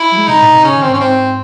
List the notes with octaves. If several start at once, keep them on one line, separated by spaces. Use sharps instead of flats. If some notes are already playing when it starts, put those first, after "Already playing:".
Already playing: E4
F#3
G#3
C3 D#4
A2
C3
C#3 C#4
D#3
C4
G#2
C#4
G#2 C4